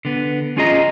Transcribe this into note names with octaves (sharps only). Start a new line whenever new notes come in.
D3 B3
C#4 F4 G#4 D#5 A#5